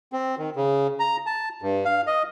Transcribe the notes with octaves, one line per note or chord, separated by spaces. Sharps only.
C4
D#3
C#3
A#5
A5
G2
F5
D#5